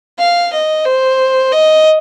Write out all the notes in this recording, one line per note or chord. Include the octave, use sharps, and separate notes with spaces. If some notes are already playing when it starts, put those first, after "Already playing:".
F5
D#5
C5
D#5